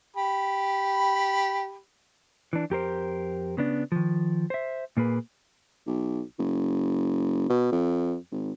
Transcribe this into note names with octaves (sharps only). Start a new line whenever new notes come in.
G4 B5
E3 D4
F2 G4 A#4 C5
C#3 B3 D4
D#3 F3
C5 E5
A#2 A#3 G#4 B4
B1
F#1
B2
F2
G#1